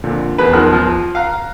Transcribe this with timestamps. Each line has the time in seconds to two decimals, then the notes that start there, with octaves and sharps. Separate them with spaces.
0.04 F2 A#2 D3
0.38 E2 G#4 A#4 B4
0.53 D#3 F3 F#6
0.73 F3
1.15 F5 A#5 F#6